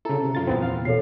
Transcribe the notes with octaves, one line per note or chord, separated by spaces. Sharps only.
C#3 E4 A4 A#5
C3
F#2 F4 A6
E2 A#2 E3 F3 B3 C4
F5
B2 A4 C#5 C7